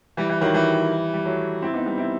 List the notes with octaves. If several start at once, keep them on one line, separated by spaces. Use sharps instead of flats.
E3 G3
E3
D#3 F#3
E3 G3
G3
F#3 A3
C4 E4
B3 D#4
G3 B3
C4 E4